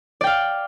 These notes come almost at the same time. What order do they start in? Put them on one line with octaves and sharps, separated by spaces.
D5 G5 F5